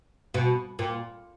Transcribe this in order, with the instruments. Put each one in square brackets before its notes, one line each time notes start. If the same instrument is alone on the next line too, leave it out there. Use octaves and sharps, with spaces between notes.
[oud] B2
A#2